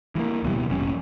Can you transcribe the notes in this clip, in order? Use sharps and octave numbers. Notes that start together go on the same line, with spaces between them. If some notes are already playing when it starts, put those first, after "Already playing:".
E3 G3 A#3
D1 B2 E3 G3
F1 A#1 G3 C#4